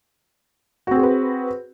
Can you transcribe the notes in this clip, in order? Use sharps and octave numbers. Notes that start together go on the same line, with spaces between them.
C4 F#4 G#4 B4 C5